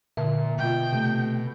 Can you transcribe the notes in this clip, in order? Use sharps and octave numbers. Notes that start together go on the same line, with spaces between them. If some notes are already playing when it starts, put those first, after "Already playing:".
A#2 D3 E5 A5
B2 G#3 F4 G5
C3 A3